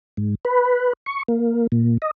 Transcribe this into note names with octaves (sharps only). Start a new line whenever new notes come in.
G#2
B4
C#6
A#3
A#2
D#5